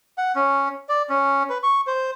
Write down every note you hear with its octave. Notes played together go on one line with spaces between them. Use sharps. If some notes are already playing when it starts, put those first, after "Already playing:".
F#5
C#4
D5
C#4
B4
C#6
C5